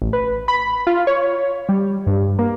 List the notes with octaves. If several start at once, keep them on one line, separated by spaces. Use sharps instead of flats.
A1
B4
B5
F4
C#5
G3
G2
A#3